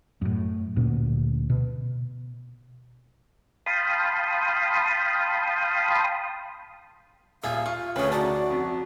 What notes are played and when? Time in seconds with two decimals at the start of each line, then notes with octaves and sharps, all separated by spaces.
0.22 F#2 A2
0.77 D2 A#2 A#3 C#4
1.50 B2
3.66 F5 G5 A5 B5 C6 D#6
7.43 D#1 F4 G#4 E5 F5
7.66 F4 C#6
7.96 D2 C#3 A3 C#4 B4 C#5 D#5
8.12 D#4 F#4 D5 F#5 A5
8.50 F2